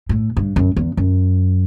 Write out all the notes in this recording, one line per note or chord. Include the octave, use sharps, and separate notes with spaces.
A2
G2
F#2
E2
F#2